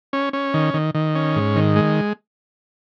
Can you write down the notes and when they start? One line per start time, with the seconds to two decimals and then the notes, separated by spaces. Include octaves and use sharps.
0.13 C#4
0.33 C#4
0.54 D#3
0.74 D#3
0.95 D#3
1.15 C#4
1.36 G#2
1.56 D#3
1.76 G#3